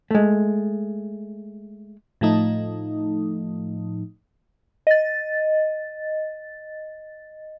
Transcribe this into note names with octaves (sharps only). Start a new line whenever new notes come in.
G#3 A3
A2 F3 A3 D#4
D#5 A6